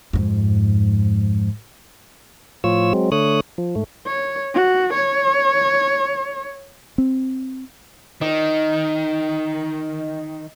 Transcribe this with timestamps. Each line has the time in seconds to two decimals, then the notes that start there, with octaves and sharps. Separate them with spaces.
0.13 F2 G#2
2.64 A2 F3 F4 C#5 E6
2.93 F#3 G#3 C4
3.12 D3 A3 C#5 D#6 F#6
3.58 F3
3.75 G#2 A3
4.07 C#5
4.54 F#4
4.94 C#5
6.98 C4
8.21 D#3 D#5